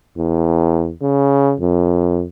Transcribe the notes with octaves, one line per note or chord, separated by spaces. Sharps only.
E2
C#3
F2